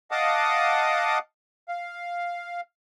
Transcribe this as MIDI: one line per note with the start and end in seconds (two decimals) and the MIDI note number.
0.11 1.19 75
0.11 1.19 77
0.11 1.19 78
0.11 1.19 81
0.11 1.19 86
0.11 1.19 87
1.69 2.61 77